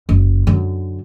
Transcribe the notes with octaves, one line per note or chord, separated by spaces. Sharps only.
F#1
F#2 D3